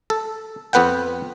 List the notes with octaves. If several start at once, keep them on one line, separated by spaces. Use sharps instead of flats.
A4
F2 B3 B4 F#5 G5